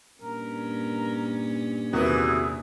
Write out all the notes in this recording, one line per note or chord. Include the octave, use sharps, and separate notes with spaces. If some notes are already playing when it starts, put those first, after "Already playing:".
G2 A#2 C#4 A#4
E2 C3 D#3 E3 F#4 G#4